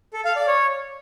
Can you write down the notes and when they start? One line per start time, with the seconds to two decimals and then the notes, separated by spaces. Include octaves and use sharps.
0.13 A4
0.25 F5
0.36 D5
0.47 C#5